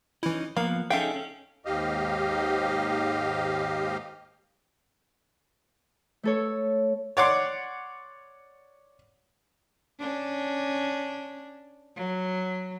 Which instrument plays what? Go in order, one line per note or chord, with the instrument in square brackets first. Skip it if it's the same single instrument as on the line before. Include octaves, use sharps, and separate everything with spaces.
[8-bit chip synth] E3 E4 [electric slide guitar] C#4 D#4
[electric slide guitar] F3 B3 [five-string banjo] A#3 [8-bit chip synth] F5
[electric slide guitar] C#4 D#4 G#4 [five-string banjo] A4 G5 [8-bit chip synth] E5 F5
[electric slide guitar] C#4
[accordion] D#2 G#2 G4 D#5 F5
[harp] A3 A4 C#5
[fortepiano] C#5 D5 F#5 C6 D6
[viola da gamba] C#4 D4
F#3